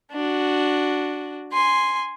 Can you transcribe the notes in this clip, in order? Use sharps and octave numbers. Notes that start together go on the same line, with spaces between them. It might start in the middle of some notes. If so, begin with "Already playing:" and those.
D4 F#4
G#5 C6